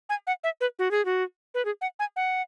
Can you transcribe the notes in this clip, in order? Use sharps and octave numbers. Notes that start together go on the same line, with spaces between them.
G#5
F#5
E5
B4
F#4
G#4
F#4
B4
G#4
F#5
G#5
F#5